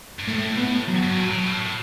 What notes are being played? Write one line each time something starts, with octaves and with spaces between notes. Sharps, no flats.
G2
A2 A3
B3
F#3
G2
A2
B2
A2
A2